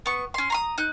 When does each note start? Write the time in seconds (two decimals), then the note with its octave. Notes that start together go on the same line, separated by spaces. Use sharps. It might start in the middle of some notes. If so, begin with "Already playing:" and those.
0.06 B3 C#6
0.34 C#4 C6
0.50 A#5 C6 D#6
0.78 D#4 F#6